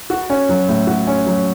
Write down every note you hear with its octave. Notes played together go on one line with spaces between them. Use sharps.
F#4
C#4
F#3
A2
F#4
C#4
F#3